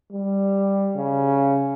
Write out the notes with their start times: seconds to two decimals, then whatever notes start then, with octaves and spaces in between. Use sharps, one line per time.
0.12 G3
0.95 C#3